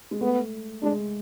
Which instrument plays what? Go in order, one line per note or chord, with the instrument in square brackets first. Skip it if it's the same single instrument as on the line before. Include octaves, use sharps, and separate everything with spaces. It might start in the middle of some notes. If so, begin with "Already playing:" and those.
[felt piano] G#3
[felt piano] A3 [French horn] B3
[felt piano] G#3 [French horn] D4